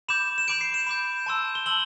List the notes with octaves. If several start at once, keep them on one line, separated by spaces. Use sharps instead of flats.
B5 D6 G6 E7
E7
B5 D6 G6 D7
C7
E7
B5 D6 G6
A5 C6 E6
G7
A5 C6 E6 F#7